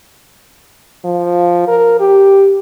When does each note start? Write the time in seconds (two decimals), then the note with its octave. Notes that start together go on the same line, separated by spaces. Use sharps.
1.05 F3
1.68 A#4
2.00 G4